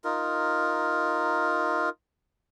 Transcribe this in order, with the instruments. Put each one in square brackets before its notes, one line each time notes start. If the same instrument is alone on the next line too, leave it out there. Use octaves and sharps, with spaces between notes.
[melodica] D#4 F4 A#4